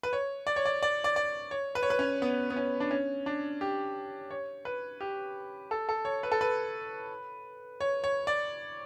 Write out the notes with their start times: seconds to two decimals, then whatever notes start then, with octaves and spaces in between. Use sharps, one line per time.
0.03 B4
0.13 C#5
0.47 D5
0.56 C#5
0.66 D5
0.83 D5
1.04 D5
1.16 D5
1.51 C#5
1.75 B4
1.83 C#5
1.90 B4
1.99 C#4
2.22 B3
2.50 B3
2.56 C#4
2.80 D4
2.91 C#4
3.26 D4
3.61 G4
4.31 C#5
4.65 B4
5.00 G4
5.71 A4
5.89 A4
6.05 C#5
6.23 B4
6.32 A4
6.41 B4
7.80 C#5
8.04 C#5
8.27 D5